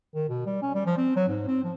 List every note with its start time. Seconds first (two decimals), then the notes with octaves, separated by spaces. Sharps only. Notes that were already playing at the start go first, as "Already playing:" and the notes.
0.15 D#3
0.29 B2
0.46 G3
0.62 C#4
0.74 G3
0.86 F3
0.97 C4
1.16 F#3
1.28 G#2
1.48 C4
1.64 F3